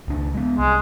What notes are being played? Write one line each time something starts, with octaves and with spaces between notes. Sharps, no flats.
C#2 D4
G#3 B3
C2 G#3